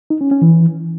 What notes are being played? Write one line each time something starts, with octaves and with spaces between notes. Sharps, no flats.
D#4
C#4
C#4
E3